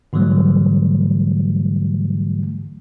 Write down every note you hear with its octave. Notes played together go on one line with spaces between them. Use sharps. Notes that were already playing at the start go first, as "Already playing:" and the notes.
G#2 D3 E3 F#3 G3 A3